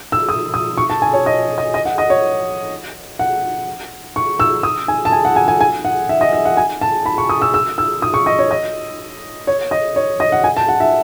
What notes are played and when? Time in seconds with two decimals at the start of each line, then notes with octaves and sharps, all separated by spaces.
0.12 E6
0.29 D#6
0.54 D#6
0.78 C#6
0.90 A5
1.02 G#5
1.13 C#5
1.26 D#5
1.58 D#5
1.74 D#5
1.85 F#5
1.98 D#5
2.10 C#5
3.19 F#5
4.16 C#6
4.40 E6
4.63 D#6
4.88 G#5
5.05 A5
5.12 G#5
5.25 F#5
5.36 G#5
5.48 G#5
5.61 G#5
5.85 F#5
6.09 E5
6.21 D#5
6.33 E5
6.45 F#5
6.57 G#5
6.81 A5
7.06 B5
7.18 C#6
7.29 D#6
7.42 E6
7.54 E6
7.78 E6
8.02 D#6
8.14 C#6
8.26 D#5
8.39 C#5
8.51 D#5
9.47 C#5
9.71 D#5
9.96 C#5
10.20 D#5
10.32 F#5
10.44 G#5
10.57 A5
10.68 F#5
10.80 E5